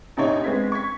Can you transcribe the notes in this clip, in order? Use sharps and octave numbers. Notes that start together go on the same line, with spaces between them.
A#1 C3 D#4 C#5
G#3 B3 C4 G#6 B6
C#6 G#6 B6